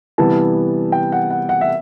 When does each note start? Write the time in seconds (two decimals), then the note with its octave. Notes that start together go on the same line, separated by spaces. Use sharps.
0.18 C3 E3 G3 B3 E4 A5
0.92 G5
1.12 F#5
1.30 F#5
1.49 F#5
1.61 E5